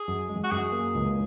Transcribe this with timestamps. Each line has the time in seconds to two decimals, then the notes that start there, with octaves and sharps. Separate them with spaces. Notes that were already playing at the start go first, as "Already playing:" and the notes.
Already playing: G#4
0.08 F#2
0.29 G#3
0.44 F#4
0.52 F#2 G#4
0.72 A#3
0.95 C#2